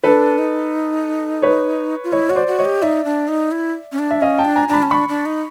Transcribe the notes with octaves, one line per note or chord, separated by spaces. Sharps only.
D4 A4 B4
D#4
B4 C#5
F4
E4 C#5 D#5
F#4 C#5
C5 D5
F#4
C#5 D#5
G4
D#4 D5 E5
D4
D#4
E4
C#4
D4
E5
C#4 D#5 F5
G5 A5
D4
G#5 A#5
D4 A5 A#5 B5
C#4
D4 B5 C#6
D4
D#4